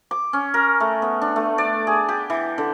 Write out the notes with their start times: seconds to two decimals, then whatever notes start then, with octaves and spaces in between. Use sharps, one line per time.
0.11 D6
0.33 C#4
0.54 A#4
0.80 A3
1.02 B3
1.22 D4
1.36 A3
1.58 D5
1.87 G#4
2.09 G4
2.30 E3
2.58 D3